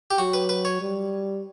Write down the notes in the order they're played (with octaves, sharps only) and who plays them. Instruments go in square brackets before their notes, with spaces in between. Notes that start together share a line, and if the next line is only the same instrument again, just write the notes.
[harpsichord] G4
[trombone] F#3 [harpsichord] F#4
[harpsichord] B4
B4
C#5
[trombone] G3